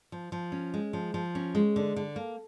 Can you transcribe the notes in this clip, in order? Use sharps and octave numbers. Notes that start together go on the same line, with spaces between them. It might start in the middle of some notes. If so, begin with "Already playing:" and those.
F3
F3
C#4
G#3
F3
F3
C#4
G#3
D3
D3
A#3